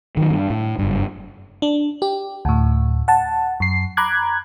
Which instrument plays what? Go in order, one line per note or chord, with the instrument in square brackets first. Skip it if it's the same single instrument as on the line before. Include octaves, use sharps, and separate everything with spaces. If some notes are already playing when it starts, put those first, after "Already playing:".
[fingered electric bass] D#3 F3 F#3
G2
A2
F#1 G2
[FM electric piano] D4
G4
D2 A2
F#5 A5
F#2 C7
A#5 B5 D6 F#6 G#6